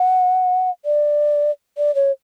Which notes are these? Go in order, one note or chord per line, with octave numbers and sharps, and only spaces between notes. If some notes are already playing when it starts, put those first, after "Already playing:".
Already playing: F#5
D5
D5
C#5